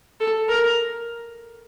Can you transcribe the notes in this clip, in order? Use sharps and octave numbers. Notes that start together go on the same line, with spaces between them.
A4
A#4